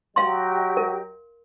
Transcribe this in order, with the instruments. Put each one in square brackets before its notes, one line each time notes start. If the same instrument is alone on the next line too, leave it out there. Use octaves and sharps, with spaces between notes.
[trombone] F#3 [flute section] G4 D#5 G5 [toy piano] F5 C6
[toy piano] A#4